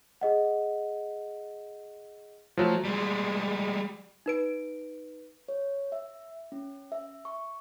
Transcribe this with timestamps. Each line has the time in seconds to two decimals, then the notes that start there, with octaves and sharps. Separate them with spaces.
0.21 G#4 D#5 F#5
2.57 F3 F#3 A3
2.85 G3 G#3
4.26 D#4 B4 D7
5.49 C#5
5.92 E5
6.52 C#4
6.92 E5
7.25 C#6